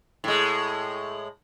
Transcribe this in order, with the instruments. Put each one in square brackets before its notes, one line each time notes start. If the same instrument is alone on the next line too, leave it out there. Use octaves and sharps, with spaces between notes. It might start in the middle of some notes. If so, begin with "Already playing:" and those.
[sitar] A2 G#3